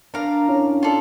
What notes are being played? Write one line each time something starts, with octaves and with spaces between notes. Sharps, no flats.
D4 A#4 D5 F5 A#5
C#4 E4
F4 A4 D5